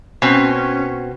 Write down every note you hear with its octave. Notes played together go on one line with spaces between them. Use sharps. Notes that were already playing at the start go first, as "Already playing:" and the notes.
B2 C4 C#4